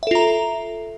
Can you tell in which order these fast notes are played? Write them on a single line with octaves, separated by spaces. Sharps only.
E5 A4 F4 A#5